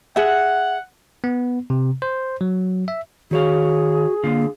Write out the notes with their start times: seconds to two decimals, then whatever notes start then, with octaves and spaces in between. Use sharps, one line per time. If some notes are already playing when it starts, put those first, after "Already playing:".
0.16 G#4 E5 F#5
1.24 B3
1.70 C3
2.02 C5
2.41 F#3
2.88 E5
3.31 D#3 F#4 G#4 C#5 F5
4.24 D3 A#3 F4 F5